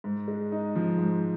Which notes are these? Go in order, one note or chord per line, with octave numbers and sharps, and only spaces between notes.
G#2
G#3
D#4
F3
G#2